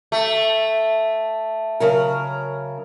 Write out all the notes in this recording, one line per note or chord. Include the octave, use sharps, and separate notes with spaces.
A3
C#3 F#3 A#4